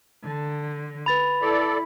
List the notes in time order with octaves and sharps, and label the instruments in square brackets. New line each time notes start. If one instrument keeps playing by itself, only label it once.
[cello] D3
[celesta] B4 A6 F7 [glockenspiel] B5
[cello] E4 [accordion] A4 D5